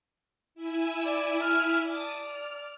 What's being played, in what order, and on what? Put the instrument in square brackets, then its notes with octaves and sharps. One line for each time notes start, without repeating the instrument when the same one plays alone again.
[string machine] E4 E5 G#5
[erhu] D5
F6
[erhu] D5 [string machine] A5 D#6 A6
[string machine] F6